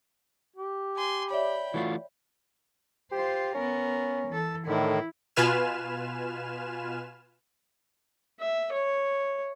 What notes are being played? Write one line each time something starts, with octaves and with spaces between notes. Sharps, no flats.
G4
G#5 C6
C#5 D5 E5 G5 B5
E3 A3 F4 F#4
F4 G4 C5
B3 C#4 A#4
E3 A4
A2 D3 D#3 E4
B2 F4 B4 G#5 F6 E7
E5
C#5